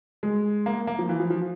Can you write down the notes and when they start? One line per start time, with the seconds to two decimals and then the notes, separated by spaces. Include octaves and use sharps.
0.23 G#3
0.66 A#3
0.87 A#3
0.98 F3
1.09 E3
1.20 F3
1.30 F3